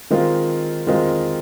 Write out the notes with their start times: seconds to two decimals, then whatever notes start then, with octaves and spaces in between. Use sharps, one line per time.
0.11 D#3 G#3 C4 F4
0.87 D#3 G#3 C4 F4